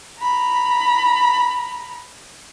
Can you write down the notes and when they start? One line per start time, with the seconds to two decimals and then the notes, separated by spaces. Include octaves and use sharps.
0.22 A#5 B5